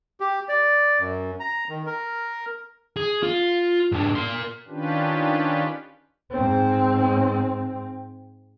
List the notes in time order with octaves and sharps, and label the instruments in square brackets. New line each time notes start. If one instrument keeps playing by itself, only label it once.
[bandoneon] G4
D5
F#2
A#5
D#3
A#4
[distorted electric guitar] G#4
F4
G#2 D4
A#4 C6
[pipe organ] D#3 C#4 D4 F4 G4 B4
[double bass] G#2 C4